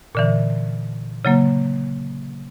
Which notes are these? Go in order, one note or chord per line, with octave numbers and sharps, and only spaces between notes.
A#2 D3 E3
C#3 F#3 A#3